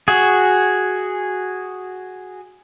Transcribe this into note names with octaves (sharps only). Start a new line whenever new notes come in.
F#4 G#4